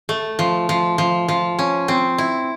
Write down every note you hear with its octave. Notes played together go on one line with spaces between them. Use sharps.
A3
F3
F3
F3
F3
C#4
C4
E4